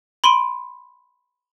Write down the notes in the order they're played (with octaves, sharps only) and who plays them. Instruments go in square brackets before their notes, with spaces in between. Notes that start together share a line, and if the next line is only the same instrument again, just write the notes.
[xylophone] B5 C6 D7 D#7